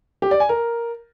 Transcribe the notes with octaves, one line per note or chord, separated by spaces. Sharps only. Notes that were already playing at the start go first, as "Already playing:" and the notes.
G4
D5
G#5
A#4